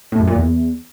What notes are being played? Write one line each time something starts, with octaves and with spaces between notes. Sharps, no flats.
A2
F#2
A#2
E2